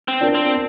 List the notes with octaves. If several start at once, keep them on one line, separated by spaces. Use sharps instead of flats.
C4
D4 F4 A#4
C4